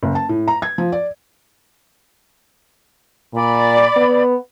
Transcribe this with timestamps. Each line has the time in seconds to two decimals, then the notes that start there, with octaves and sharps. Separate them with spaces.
0.03 F#1
0.15 A5
0.29 A2
0.48 A#5
0.62 G#6
0.78 F3
0.92 D5
3.34 A#2 D5 B5
3.96 B3